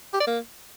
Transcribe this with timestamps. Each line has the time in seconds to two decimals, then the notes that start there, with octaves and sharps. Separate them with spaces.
0.13 G4
0.20 D5
0.27 A#3